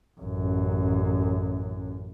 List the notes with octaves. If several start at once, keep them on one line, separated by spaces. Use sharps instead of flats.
A1 F#2